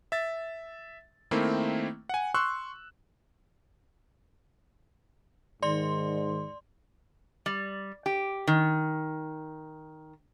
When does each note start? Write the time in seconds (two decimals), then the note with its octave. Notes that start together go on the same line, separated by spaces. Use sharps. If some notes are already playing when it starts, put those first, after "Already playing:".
0.12 E5 A6
1.31 D#3 A3 A#3 C4 E4
2.09 F#5 G#5
2.34 C6 C#6 E6 F#6
5.62 G#2 D#3 D5 C6
7.46 G3
8.06 G4
8.47 D#3